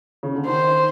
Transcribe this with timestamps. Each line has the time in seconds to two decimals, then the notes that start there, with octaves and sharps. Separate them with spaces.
0.23 C#3
0.35 D3
0.46 D#3 C5